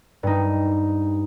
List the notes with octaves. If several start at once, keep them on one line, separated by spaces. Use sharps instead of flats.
G2 D#4